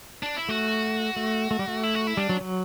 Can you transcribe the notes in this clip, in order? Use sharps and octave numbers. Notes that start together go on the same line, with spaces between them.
D4
E4
A3 F#4
A3
A3
G3
A3
E4
F#4
E4
G3 D4
F#3
F#3